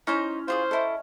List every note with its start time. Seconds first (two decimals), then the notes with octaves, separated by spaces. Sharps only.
0.07 C#4 D#4 E4 C5 A#5
0.48 F4 G4 G#4 C5
0.71 E4 A4 D#5 E5